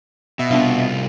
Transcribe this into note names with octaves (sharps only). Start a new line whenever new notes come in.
B2 E5
C2 B3 D4 F4 F5